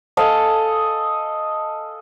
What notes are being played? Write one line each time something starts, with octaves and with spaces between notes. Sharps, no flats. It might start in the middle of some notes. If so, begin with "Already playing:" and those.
A4 D#5 F5 G#5